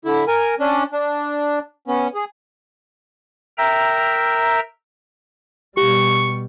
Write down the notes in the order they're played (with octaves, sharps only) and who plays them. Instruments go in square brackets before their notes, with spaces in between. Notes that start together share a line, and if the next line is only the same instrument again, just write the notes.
[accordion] D3 E4
A#4 G#5
C#4 D4
D4
B3 C#4
G#4
[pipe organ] A#4 E5 G5 A#5
[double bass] B2 G3 [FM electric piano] G4 [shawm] C#6